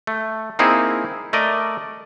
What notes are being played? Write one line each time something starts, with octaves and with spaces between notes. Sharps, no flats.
A3
A#3 C4 D#4 E4 G#4
A3 A#4 D5 D#5